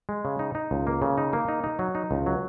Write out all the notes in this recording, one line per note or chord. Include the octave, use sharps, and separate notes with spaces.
G#3
C#3
D#4
D#4
C#2
A#3
C#3
D#4
A#3
D#4
D#4
F#3
D#4
C#2
F#3